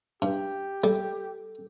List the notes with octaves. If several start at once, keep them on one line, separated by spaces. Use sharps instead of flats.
G2 G4
G3 A4